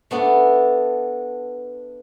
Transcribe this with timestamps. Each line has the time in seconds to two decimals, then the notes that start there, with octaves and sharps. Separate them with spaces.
0.11 A3 B3 D4 A4